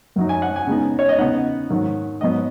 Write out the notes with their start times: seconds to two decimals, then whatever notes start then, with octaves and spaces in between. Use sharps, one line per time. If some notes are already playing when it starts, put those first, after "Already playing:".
0.16 F#2 F#3 D#4
0.29 G#5
0.42 F#5
0.56 G#5
0.67 C#3 G#3 B3 D#4
0.99 C#5
1.09 D#5
1.18 C#3 B3 D#4 F#5
1.70 G#2 D#3 F#3
2.21 G#2 F#3 B3 D#5